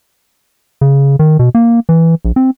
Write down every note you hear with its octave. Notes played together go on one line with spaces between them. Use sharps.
C#3
D#3
B2
A#3
E3
A#1
C4